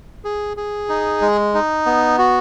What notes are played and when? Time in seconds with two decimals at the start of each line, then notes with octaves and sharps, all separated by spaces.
0.25 G#4
0.57 G#4
0.89 D#4
1.21 G#3
1.54 D#4
1.86 B3
2.18 F#4